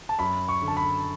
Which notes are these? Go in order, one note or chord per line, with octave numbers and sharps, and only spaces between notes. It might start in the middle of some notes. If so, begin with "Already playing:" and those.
A5
F#2 B5
C#6
D3
A5
B5